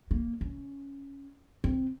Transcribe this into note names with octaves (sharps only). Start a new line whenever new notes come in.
A#3
C#4
C4